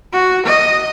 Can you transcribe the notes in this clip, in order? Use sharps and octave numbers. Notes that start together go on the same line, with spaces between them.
F#4
D#5